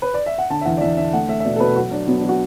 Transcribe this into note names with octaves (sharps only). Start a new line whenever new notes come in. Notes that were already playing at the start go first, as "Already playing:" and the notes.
B4
D5
E5
F#5
D3 A5
E5
E2 F#5
D5
E2 E5
D3 E5
A3 F#5
A3 E5
E5
B2 D5
A4
B2 B4
F#3 F#4
F#3 D4
F#3 B3
D4
F#3
F#4